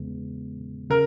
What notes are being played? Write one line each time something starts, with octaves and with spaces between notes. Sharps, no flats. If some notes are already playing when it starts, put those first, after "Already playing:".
Already playing: E2 C#3 G#3 B3
C#3 A#4